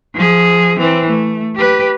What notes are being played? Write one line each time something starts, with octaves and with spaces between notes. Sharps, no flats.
F3 G#4
E3 C4
A3
G4 B4